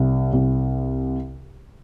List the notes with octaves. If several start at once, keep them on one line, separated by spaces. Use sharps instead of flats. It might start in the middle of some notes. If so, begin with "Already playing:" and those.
Already playing: C2
C2